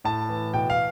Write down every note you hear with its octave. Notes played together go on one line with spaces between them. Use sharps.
A2 A5
E3
B2 G5
F5